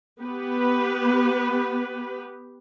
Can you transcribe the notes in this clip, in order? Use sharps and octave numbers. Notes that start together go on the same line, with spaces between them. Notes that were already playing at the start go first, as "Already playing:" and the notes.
B3 G4 B4